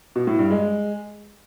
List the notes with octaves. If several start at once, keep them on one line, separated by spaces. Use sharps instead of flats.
B2
A2
G2
G#3